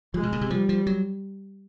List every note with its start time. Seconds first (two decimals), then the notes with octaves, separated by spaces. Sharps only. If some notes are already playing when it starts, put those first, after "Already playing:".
0.14 F3 G#3
0.23 B2
0.32 A#2
0.41 C3
0.50 F3 G3
0.69 F3
0.87 F#3